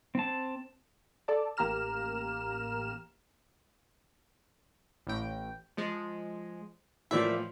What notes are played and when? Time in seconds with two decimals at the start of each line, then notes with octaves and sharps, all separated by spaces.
0.15 C4 A5
1.28 A4 D5 A5
1.57 A1 A#3 G4 A#5 F6 E7
5.07 A1 A2 G5
5.77 F3 G#3
7.11 A2 E3 F3 A#3 D5 E5